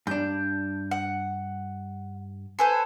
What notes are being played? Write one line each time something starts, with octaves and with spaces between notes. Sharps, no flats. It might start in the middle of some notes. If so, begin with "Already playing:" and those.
G2 D4 G6
F#5
A4 B4 C5 G#5